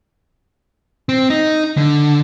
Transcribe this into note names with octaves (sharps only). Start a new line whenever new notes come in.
C4
D#4
D3